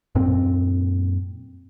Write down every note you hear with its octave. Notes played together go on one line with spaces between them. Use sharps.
F#2 A#2 C4